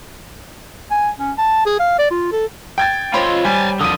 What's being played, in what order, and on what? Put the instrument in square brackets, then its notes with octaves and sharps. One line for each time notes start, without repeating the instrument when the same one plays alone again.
[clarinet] G#5
C#4
A5
G#4
F5
D5
F4
A4
[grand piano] G5 G#6 A6
[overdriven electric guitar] F4 D#5 [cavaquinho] C5 C#5 B5
[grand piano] G3 [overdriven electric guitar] G#5 A5
[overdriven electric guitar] D3 F3 [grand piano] D#6 D#7